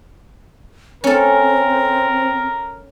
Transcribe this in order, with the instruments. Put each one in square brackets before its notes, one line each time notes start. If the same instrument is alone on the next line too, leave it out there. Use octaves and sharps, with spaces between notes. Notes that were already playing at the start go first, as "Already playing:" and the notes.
[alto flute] C4 [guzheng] C#4 A4 [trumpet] A#4